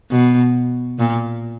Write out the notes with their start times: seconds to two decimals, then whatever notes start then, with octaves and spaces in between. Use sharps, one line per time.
0.11 B2
0.99 A#2